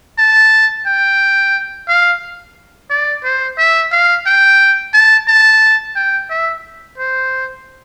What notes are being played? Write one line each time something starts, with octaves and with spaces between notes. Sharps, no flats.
A5
G5
F5
D5
C5
E5
F5
G5
A5
A5
G5
E5
C5